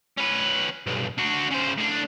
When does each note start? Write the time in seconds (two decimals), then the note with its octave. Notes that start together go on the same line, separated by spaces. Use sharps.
0.17 C#4 B4
0.87 B1 G2
1.18 D4 F#4
1.51 C#3 C5
1.78 A2 D4